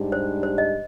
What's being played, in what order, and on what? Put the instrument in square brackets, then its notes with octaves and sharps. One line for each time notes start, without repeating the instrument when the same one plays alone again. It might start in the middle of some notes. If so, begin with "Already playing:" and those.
Already playing: [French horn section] G#2 G3 D4 G4
[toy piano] C5
C5
D#5